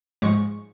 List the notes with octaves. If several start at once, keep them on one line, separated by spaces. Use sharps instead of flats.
G#2 F3 G#3 C#6